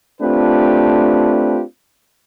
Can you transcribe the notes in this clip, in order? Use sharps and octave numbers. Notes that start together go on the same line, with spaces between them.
A3 C4 D4 F4 G4 B4